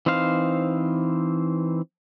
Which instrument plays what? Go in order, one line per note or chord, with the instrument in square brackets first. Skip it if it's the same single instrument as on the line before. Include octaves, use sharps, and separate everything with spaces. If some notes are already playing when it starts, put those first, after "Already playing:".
[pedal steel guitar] E3 C4 D#4 C5 F5